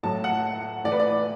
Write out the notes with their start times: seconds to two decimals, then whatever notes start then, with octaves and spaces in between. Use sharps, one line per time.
0.03 A2 F#3 A5
0.24 F#5
0.84 A2 E3 D5
0.92 B4
1.00 D5